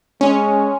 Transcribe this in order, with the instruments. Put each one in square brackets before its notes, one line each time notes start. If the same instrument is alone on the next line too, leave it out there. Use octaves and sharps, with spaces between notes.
[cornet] G#3 [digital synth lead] C#4